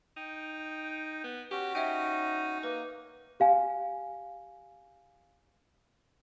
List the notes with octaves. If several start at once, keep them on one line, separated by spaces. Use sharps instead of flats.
D#4 G5
B3
C#4 F#4 G4
D#4 C#5 E5 G5
A#3 B4
G4 F5 G#5